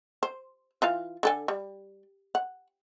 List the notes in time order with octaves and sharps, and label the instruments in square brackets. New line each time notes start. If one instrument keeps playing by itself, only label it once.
[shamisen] C5
E3 F4 F5
D3 A4 G#5
G3
F#5